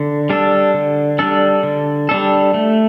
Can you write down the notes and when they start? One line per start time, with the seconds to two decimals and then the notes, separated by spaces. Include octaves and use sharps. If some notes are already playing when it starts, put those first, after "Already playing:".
Already playing: D3
0.30 G3 D4 A4
0.74 D3
1.19 G3 D4 A4
1.63 D3
2.09 G3 D4 A4
2.54 A3